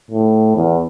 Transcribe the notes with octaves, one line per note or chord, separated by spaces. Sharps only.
A2
E2